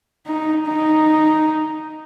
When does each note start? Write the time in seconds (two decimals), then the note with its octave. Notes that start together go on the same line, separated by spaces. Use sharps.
0.27 D#4
0.67 D#4